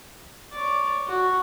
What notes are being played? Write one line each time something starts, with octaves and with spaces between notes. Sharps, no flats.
C#5 D5
F#4